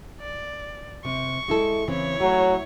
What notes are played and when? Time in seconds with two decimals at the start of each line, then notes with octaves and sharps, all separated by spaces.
0.20 D5
1.05 C3 C#6
1.48 G#3 E4 A4
1.88 C#3 E3 C4 E4 C#5
2.21 F#3 A3